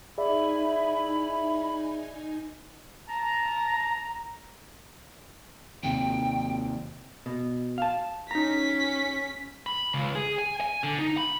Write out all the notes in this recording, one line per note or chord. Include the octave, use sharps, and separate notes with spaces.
D#4 E4 G#4 D5 E5 G#5 B5
A5 A#5
D#2 C3 G5
B2
F5 A5
C#4 D#4 A#5 B6
B5
C#2
G#4
G#5
G#5
D3
D#4
B5